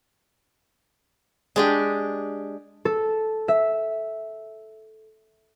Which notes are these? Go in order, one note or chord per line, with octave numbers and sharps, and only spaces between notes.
G#3 D4 G4
A4
E5